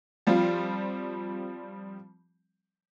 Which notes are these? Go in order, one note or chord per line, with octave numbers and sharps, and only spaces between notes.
F3 G3 C4 F4